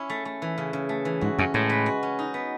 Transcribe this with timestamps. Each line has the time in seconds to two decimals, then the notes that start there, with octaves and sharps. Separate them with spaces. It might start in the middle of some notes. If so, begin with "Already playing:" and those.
Already playing: C#4 E4
0.10 A3
0.25 A3
0.42 E3
0.58 C#3
0.73 C#3
0.89 A3
1.05 E3
1.21 G#2 F#4
1.38 F#2 C#4
1.54 A2 G#3
1.70 B4
1.86 F#4
2.03 C#4
2.19 D#4
2.34 B3